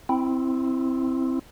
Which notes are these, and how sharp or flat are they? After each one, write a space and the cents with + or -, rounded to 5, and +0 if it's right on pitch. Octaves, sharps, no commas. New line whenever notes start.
C4 +0 E4 +0